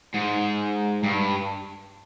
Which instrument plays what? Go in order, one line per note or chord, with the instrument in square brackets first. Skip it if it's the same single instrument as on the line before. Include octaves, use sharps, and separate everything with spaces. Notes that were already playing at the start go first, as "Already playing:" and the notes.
[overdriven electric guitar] G#2
G2